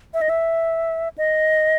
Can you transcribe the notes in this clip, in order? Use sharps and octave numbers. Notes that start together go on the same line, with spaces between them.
E5
D#5
E5
D#5